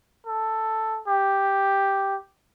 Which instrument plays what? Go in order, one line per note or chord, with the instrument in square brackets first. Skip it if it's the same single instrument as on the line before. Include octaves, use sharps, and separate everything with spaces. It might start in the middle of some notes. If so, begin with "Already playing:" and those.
[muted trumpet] A4
G4